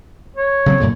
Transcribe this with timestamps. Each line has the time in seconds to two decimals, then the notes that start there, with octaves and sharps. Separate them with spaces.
0.36 C#5
0.66 C#3 F#3 C4
0.80 F#2 A#2 D3